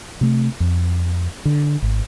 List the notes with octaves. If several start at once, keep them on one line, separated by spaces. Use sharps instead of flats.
C3 A3
F2
D3
G#1